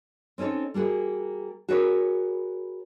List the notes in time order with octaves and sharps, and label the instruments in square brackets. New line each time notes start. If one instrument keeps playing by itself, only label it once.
[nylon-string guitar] C4 C#4 D#4 A4 C#5
G3 A#3 F#4 G#4
F#4 G#4 A#4 B4 C#5